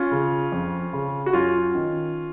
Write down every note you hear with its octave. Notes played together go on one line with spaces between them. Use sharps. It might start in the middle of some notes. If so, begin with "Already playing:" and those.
Already playing: C#4 F4
C#3
F2
C#3
F#4
F#2 C#4 F4
D#3